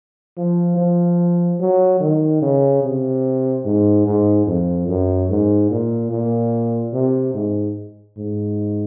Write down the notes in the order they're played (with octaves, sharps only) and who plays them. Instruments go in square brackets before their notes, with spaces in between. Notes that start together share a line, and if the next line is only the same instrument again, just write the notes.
[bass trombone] F3
F3
F#3
D#3
C#3
C3
G#2
G#2
F2
F#2
G#2
A#2
A#2
C3
G#2
G#2